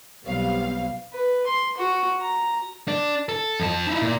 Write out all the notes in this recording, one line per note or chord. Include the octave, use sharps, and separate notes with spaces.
B1 F#3 G3 B3 C4 F5
B4
C6
F#4
A#5
D4
A4
F2 A5
D#4 E4
A#2